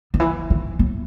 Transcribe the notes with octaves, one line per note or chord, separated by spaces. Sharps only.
D#3
E3
D#3
F#3